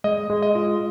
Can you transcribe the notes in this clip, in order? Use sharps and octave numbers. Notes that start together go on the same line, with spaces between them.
G#3 D#5
G#3
D#5
F4